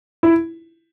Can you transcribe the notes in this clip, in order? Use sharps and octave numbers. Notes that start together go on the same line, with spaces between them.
E4